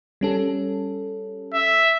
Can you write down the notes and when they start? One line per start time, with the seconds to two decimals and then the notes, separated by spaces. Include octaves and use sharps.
0.21 G3 C#4 A4
1.54 E5